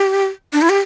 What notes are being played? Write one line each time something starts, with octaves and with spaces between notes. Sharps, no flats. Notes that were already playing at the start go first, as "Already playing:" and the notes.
Already playing: G4
D4
E4
G4